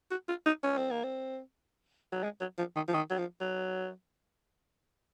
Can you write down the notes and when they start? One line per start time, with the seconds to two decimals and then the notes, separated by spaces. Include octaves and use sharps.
0.11 F#4
0.29 F4
0.46 D#4
0.64 C#4
0.78 C4
0.91 A#3
1.04 C4
2.12 F#3
2.23 G#3
2.41 F#3
2.58 F3
2.76 D#3
2.88 F3
2.94 D#3
3.10 F#3
3.18 F3
3.41 F#3